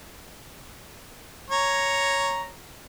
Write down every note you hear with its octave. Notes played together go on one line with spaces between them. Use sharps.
C#5 A#5